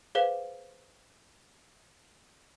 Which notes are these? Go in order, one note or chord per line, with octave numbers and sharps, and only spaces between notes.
G#4 B4 C5 F5 B6